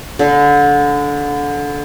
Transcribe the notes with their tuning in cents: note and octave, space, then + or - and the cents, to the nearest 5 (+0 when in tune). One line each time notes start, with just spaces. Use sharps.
D3 -20